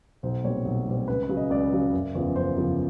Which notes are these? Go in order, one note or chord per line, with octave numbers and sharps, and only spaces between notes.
B1 C5
A#2 G3 C4 C#5
B1
A#2 G3 C4
C#2 B4
B4
C#3 F#3
D#5
C#2 D5
C#3 F#3
F#1
E2 C#3 F3
F#1 C5
E2 C#3 F3